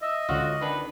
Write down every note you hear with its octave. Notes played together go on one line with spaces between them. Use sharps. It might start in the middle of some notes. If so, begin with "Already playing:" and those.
D#5 E5
C#2 D3 F4 F#4
D#3 D4 B4